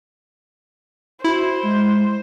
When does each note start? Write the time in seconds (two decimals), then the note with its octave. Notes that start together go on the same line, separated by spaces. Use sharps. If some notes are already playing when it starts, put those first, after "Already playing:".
1.24 E4 F#4 C5
1.63 G#3